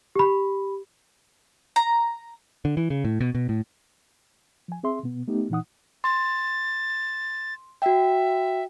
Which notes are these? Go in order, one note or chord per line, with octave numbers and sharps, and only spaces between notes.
G4 B5
A#5
D3
E3
C#3
A2
B2
B2
A2
F3 G#5
C4 G#4 E5 C6
B2 B3
A3 B3 D#4 G4
A#2 E3 D#4 F#5 D#6
C6 A6
F#4 E5 G5